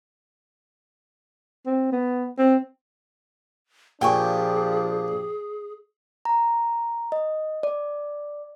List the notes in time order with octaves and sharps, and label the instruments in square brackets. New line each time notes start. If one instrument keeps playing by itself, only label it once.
[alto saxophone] C4
B3
C4
[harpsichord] A#2 [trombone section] F3 D4 G4 [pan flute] G#4 [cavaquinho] G5 G#5 C#6
[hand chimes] A#5
D#5
D5